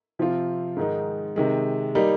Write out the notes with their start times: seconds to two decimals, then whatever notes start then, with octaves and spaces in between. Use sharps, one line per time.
0.19 C3 F3 C4 F4
0.76 G#2 D#3 G#3 D#4
1.36 C3 D#3 G#3
1.95 G3 A#3 D#4